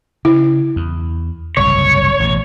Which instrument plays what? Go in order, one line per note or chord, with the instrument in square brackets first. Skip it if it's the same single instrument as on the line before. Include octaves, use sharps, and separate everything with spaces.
[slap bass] C#3 [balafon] E4
[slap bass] E2
[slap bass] F#1 C2 G#2 [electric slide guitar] C#5
[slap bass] A1 B2